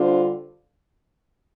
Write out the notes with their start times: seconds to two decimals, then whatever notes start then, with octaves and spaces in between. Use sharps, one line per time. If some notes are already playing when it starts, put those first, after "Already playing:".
Already playing: D3 G3 D4 F4 C5